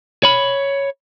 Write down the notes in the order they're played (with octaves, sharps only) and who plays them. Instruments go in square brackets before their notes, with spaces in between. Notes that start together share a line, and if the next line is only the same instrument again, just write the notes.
[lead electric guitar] C#5 B5